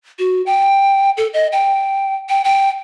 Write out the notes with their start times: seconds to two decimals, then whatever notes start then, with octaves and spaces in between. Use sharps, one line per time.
0.19 F#4
0.46 G5
1.17 A4
1.33 D#5
1.52 G5
2.29 G5
2.44 G5